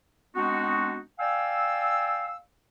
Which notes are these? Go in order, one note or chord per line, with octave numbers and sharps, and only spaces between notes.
G#3 B3 C4 D4 D#4 F#4
D5 F5 G5 G#5 E6